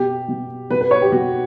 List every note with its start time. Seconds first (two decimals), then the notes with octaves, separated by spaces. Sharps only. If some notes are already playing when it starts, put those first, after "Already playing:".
Already playing: B2 G4
0.29 B2
0.70 B2 B4
0.81 B4
0.91 C#5
1.02 G4
1.12 B2 F#4